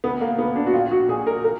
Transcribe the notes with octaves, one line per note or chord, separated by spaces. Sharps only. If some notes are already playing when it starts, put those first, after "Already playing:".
D2 B3
A#3
D2 B3
D4
F#4
A#1 F4
F#4
A#2 G#4
A#4
A#4